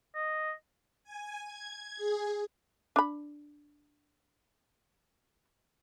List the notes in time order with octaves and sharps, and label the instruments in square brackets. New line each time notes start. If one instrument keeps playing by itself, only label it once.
[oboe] D#5
[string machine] G#5
G#6
G#4
[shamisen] D4 B5